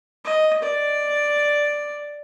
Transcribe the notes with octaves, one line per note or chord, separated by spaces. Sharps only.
D#5
D5